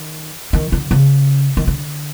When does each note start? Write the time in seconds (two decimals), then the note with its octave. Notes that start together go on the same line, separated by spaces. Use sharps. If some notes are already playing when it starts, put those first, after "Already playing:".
Already playing: D#3
0.53 D#3
0.72 D3
0.91 C#3
1.57 D#3
1.67 D3